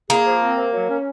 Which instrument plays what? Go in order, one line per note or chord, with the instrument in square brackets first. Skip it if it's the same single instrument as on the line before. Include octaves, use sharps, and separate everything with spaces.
[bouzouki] A#3 [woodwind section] G#4
[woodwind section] F3
C4
C3
F#3
C#4